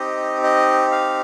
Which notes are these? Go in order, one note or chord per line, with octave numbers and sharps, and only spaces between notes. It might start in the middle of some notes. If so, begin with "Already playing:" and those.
Already playing: C4 D#4 G4 D#5
D#5
F5